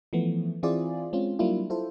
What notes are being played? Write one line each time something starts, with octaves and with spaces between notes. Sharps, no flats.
E3 F3 A3 B3
E3 C4 E4 F4 G#4 D5
G#3 C4 C#4 F4
F#3 G3 A#3 D4 E4 F4
E4 F4 A4 C5